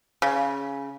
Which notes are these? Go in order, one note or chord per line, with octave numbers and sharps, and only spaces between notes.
C#3